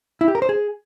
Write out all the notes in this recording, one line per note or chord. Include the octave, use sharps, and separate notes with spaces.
E4
G4
A#4
C5
G#4